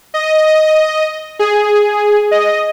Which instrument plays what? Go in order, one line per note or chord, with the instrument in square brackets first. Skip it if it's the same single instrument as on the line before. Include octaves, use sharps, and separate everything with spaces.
[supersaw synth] D#5
G#4
D#5